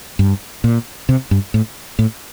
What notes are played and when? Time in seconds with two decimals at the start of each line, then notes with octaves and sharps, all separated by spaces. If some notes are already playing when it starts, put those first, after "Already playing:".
0.19 G2
0.64 A#2
1.09 C3
1.31 G2
1.54 A2
1.99 A2